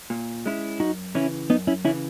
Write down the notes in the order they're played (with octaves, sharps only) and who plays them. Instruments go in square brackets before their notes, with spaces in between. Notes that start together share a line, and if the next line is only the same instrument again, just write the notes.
[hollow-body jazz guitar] A#2
G#3 C#4 E4
[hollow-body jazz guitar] F#2 [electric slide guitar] D#4 F#4
[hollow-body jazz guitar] C#3 E3 [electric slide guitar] C#4 E4
[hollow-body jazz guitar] F#2 [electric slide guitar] B3 D#4
[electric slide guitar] C#4 E4
[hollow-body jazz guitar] C#3 E3 [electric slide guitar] C#4 E4